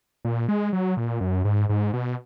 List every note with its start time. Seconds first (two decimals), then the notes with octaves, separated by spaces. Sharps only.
0.25 A#2
0.49 G#3
0.73 F#3
0.97 A#2
1.21 F#2
1.45 G#2
1.69 G#2
1.93 B2